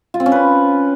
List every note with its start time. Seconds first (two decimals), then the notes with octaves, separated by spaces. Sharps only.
0.14 F4
0.20 C4
0.26 C#4
0.32 B4